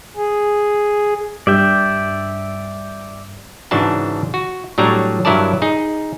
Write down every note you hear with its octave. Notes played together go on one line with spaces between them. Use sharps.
G#4
G2 D5 E5 G5
G#2 C#3 E3 D4 F#4 A5
F#4
A2 F#3 G3 D4 A#5
G2 F#3 E4 A#4 D5 A5
D#4 G#4